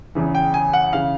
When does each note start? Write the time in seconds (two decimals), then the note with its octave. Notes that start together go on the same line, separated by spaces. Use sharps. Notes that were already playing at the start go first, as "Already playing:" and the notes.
0.15 E2 C#3 E3
0.35 G5
0.54 G#5
0.73 F#5
0.93 C#3 E3 F5